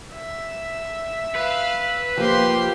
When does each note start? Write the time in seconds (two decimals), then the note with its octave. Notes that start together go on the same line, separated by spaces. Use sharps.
0.13 E5
1.35 B4 F5
2.17 F3 A#3 G4 C5 C6